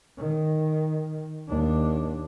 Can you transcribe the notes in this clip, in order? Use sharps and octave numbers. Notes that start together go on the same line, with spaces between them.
D#3
D#2 D4